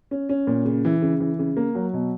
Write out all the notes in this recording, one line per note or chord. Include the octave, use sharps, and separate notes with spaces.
C#4
C#4
A#2
C#3
E3
C#3
E3
C#3
A#3
F#3
B2